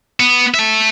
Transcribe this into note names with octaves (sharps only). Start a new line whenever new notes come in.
B3
E5 A5